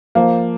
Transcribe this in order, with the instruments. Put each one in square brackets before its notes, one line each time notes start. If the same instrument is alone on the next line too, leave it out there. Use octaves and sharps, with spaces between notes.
[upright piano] F3 A#3